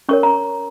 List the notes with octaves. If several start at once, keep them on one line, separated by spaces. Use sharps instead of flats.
C#4 A#4 C#5 C#6
A#5